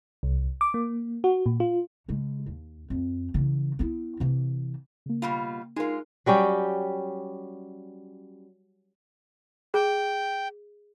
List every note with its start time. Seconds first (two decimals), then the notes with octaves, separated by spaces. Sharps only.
0.23 C2
0.61 D6
0.74 A#3
1.24 F#4
1.46 A#2
1.60 F4
2.08 C#3 G#3
2.46 D#2
2.90 F2
3.34 C#3 E3
3.79 B3 E4
4.20 C3 E3
5.06 C#3 A#3
5.22 B2 G3 F4
5.76 G#3 D#4 F4 G#4 A#4
6.26 F#3 G3 C#4 G4
9.74 G#4 G5